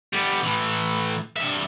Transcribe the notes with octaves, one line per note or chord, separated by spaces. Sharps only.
G3 B3
A2 E3
G2 E5